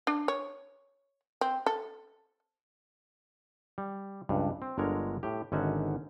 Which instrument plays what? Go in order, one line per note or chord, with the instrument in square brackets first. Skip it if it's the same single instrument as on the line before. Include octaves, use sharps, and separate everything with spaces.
[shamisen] D4
C#5
C4
A4
[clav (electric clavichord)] G3
C#2 G2
C4
G1 D3 G#3 A#4 C#5
A2 G4
G#1 D3 C#4 D#4 F#4 E5